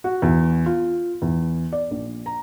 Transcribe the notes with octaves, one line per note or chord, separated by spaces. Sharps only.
F#4
E2
F4
E2
D5
A#1
A#5